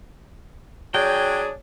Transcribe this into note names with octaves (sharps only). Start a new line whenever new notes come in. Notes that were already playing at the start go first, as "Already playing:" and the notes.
F#3 D4 G#4 C#5 G5